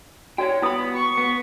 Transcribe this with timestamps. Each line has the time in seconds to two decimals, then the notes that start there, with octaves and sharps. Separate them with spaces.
0.38 F#4 C#5 D5 G5
0.62 B3 E4 B5 D#6
0.94 C#6
1.18 B3